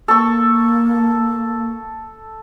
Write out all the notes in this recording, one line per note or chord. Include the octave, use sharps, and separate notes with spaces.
A#3 A4 C#6